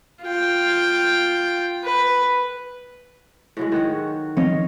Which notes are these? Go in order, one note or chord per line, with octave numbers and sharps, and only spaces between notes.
F4 G5
B4
A2 F#3 G#3
D#3 F#4 C#5
D#3 F3 C4 C#5 D#5 F5